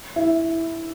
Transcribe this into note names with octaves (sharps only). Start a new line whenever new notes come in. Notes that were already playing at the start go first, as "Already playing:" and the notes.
E4